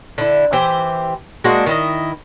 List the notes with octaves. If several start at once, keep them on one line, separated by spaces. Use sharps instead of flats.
D3 E4
E3 G4 C5 E5
G#3 A#3 D4 F#4
D#3 E4 D#5